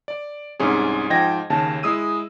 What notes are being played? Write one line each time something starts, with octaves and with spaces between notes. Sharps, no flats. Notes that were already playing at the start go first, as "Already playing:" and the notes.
D5
C2 G#2 C#4 G#4
G#2 F3 D#5 G5 G#6 A#6
D#2 C#3 A5
G#3 E4 D#6 E6 D#7